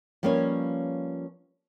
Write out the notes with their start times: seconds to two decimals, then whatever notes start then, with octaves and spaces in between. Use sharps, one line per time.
0.23 F3 G3 A#3 C#4 B4 C#5